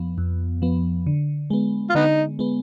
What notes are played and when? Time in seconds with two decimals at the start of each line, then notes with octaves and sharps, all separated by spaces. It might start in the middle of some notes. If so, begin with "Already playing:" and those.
Already playing: F2 F3 B3
0.18 F2
0.62 F3 B3
1.07 D3
1.50 G#3 B3
1.90 F4
1.95 D3 B3 D#4
2.39 G#3 B3